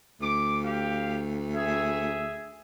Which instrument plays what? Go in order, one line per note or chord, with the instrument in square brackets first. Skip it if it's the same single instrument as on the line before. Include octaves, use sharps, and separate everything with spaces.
[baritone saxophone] D2 [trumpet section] D6
[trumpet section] G4 F5
G#4 E5